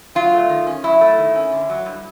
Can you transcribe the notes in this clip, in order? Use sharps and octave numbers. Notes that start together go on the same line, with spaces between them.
F#3 F4
A3
D#3
C#4
F#3 E4
A3
D#3
C#4
D3
F#3
G2